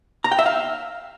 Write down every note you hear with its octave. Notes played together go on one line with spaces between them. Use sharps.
A#5
G5
E5
F5